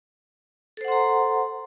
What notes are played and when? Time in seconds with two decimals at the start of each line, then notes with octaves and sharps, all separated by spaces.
0.77 A4
0.81 C5
0.85 F#5
0.88 C6
0.92 A#5